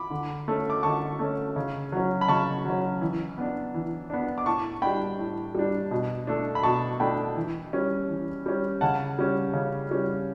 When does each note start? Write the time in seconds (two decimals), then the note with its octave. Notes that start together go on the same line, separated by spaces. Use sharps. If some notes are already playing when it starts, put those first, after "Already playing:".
Already playing: B5 D6
0.10 D3
0.48 A3 C#4
0.70 D6
0.83 D3 A5 C#6
1.19 A3 C#4
1.56 C#3
1.92 F#3 C#4
2.21 B5
2.28 C#3 A5 C#6
2.65 F#3 C#4
3.01 E3
3.38 B3 D4
3.74 E3
4.10 B3 D4
4.38 D6
4.46 A2 A5 C#6
4.82 G3 D4 G5 B5
5.19 A2
5.55 G3 D4
5.91 B2
6.27 A3 D4
6.55 B5
6.63 B2 A5 C#6
7.00 A3 D4 G5 B5
7.36 E3
7.73 G3 C#4
8.09 E3
8.46 G3 C#4
8.81 C#3 F#5 A5
9.18 G3 C#4
9.54 C#3
9.91 G3 C#4